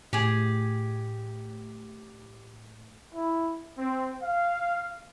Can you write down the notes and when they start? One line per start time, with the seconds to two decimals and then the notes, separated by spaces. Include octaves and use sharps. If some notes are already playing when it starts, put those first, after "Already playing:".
0.13 A2 G4 G#4
3.14 E4
3.78 C4
4.22 F5